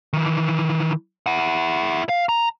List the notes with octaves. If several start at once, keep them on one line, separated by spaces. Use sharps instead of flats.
D#3 E3
E4 F#5
F5
A#5